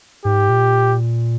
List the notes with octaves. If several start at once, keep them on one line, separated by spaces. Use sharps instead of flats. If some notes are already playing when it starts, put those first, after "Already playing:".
G#2 G4
A#2